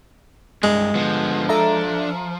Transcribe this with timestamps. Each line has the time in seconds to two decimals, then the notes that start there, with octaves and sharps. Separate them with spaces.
0.63 C2 G2 G#3
0.95 D3 F3 B3
1.49 D4 A4 E5 A#5